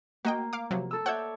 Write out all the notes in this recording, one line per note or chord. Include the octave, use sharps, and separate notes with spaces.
A#3 F#4 D#5 G5
F5 D6
C3 F3 F#3
A4 E6
C#5 D5 E5 F#5 E6 G6